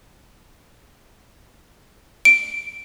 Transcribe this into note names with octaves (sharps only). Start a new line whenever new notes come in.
D7